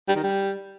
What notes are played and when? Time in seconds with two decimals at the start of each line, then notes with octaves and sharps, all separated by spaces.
0.09 G3
0.16 D#3
0.23 G3